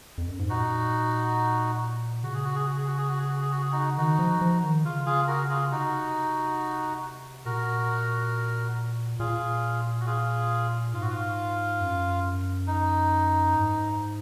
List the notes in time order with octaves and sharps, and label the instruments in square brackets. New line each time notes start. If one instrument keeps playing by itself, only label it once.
[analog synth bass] F2
F#2
G#2
[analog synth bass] A#2 [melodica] D#4 F#4
[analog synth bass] C#3 [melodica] F#4
[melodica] G#4
F#4
G#4
F#4
G#4
F#4
G#4
F#4
G#4
F#4
G#4
F#4
G#4
D#4 F#4
[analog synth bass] D#3 [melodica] D#4 F#4
[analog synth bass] F3
F3
D#3
[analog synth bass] C#3 [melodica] F4
[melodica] F4 G#4
F#4 A#4
F4 G#4
[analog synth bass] C3 [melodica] D#4 F#4
[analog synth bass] A#2 [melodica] F#4 A#4
[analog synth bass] A#2 [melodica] F4 G#4
[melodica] F#4
F4 G#4
[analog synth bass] G#2 [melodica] F4
[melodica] F#4
F4
[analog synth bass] F#2
[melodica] D#4
[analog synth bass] G#2